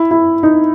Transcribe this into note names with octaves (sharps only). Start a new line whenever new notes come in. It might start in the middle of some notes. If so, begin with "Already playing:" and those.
Already playing: E4
E4
D#4